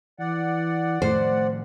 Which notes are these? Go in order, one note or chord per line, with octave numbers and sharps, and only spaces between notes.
E3 D5 F#5
A2 D#3 F3 A3 C5